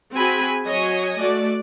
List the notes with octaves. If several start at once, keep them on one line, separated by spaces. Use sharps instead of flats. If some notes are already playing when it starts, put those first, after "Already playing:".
C4 F#4 G#4 G#5 B5
F#3 C#5 D#5 G#5
A3 F#4 D5